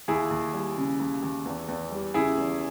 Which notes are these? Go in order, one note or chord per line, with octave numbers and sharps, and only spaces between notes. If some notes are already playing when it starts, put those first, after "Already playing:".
D#2 E4 G#4
D#2
G3
C#3
D#2
D#2
E2
E2
G3
C#3 E4 G#4
E2